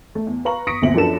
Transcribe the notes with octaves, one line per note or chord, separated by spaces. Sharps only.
A3
E2
B4 F5 A#5 C#6 F#7
C#6 D#6 A#6 B6 C#7 D7
G1 D2 A#2 C4 E5 F#7
F#2 F3 B3 D4 A4 E7